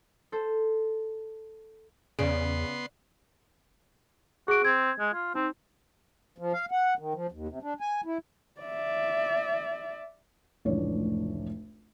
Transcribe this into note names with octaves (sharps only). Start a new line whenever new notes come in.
A4 C5
E2 C#3 B3 D5 C6
F#4 G#4 D7
C4 G#6
G#3
F4
C4 D#4
F3
F5
F#5
D#3
F3
D#2
C3
D4
G#5
E4
D5 E5
F1 C#2 A2 E3 D4 C#5